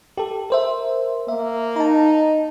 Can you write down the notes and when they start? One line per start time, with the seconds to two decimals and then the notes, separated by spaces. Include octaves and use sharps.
0.17 G4 A4
0.50 A#4 C5 E5
1.28 A#3 E5
1.76 D#4 A5 A#5